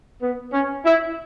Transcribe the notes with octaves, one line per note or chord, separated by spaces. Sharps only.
B3
C#4
E4